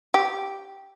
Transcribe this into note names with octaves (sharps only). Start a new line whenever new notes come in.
G4